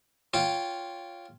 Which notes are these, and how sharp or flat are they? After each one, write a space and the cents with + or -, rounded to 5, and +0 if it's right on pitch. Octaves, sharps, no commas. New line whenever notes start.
F4 +0 C#5 +10 G5 +0